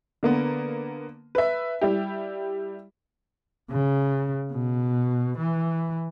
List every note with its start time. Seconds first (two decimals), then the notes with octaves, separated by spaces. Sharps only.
0.23 D3 A#3 B3
1.35 B4 E5
1.81 G3 E4 G4
3.70 C#3
4.53 B2
5.38 E3